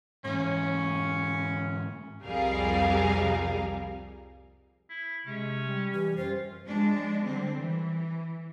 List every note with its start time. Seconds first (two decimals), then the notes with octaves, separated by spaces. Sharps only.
0.25 G#2 E3 C#4
2.24 C2 F2 G3 G#4 A#4 F5
4.89 E4
5.27 C3 G#3 C#4
5.65 G3
5.94 E3 G4
6.17 F#2 F4 C5
6.67 F3 G#3 D4
7.25 D3 G3 C4
7.58 E3